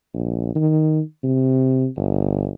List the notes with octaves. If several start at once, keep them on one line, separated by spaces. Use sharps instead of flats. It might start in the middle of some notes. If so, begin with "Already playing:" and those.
A#1
D#3
C3
G1